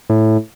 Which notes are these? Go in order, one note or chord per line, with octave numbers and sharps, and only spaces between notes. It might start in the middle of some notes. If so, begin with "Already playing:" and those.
A2